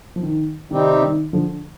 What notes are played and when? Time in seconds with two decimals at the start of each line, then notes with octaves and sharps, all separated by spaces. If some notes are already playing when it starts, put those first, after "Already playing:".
0.16 F3
0.23 D#3
0.70 C3 D#3 G3 C4 D#4 G4
1.02 D#3
1.33 D3 F3